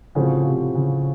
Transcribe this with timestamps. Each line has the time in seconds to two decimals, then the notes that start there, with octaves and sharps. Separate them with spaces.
0.15 A2 C#3 F3 C4 F#4 C5
0.45 C3
0.75 C#3